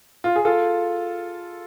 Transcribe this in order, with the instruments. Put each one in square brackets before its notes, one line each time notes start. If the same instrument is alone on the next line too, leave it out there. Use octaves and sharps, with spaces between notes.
[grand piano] F4
G#4
F4 A4